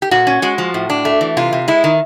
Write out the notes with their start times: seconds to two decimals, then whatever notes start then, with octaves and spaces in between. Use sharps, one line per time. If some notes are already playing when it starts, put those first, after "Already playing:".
0.02 G4
0.11 A#2 F#4
0.27 C#4
0.42 G#3 F#4
0.58 F3
0.74 A2
0.90 D4
1.05 A3
1.21 E3
1.37 C3 F4
1.53 C3
1.68 G#3 E4
1.84 D#3